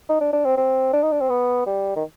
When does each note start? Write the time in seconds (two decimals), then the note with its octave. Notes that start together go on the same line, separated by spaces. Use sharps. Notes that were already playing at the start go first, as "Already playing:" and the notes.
0.09 D#4
0.21 D4
0.33 D4
0.45 C4
0.57 C4
0.93 D4
1.03 D#4
1.12 D4
1.21 C4
1.30 B3
1.66 G3
1.96 D#3